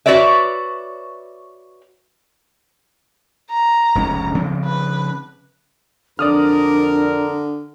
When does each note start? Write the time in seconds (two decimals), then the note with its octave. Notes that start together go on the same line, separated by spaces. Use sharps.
0.06 F#4 B4 C#5 D5 E5
3.50 A#5
3.95 F1 C#2 C#4
4.35 C#3 F3 C4
4.65 B4
6.19 F2 D3 D4 A#4 D5 D#6 F6